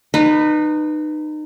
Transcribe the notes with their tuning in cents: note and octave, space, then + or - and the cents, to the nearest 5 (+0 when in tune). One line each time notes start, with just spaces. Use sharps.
D#4 -30 B4 +0